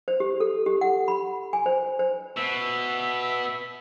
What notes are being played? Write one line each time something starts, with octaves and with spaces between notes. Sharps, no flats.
C5
G4
A4
G4
F#5
B5
G#5
C5
C5
B2 E5